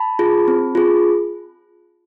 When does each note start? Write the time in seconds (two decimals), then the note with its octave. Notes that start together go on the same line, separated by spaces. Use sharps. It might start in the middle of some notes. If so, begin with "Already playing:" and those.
Already playing: A5 B5
0.19 F4 G#4
0.48 C4
0.75 F4 G#4